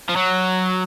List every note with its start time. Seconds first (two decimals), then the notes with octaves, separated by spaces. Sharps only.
0.09 F3
0.16 F#3